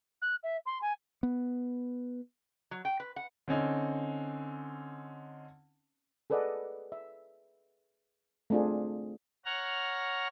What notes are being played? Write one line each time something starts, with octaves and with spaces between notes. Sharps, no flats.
F#6
E5
C6
G#5
B3
F#3
G5
B4
F#5
D3 C4 C#4 D#4
G#4 A4 B4 D5 D#5 F#5
E5
A3 C4 D4 F4 G#4
C#5 F#5 A#5 F6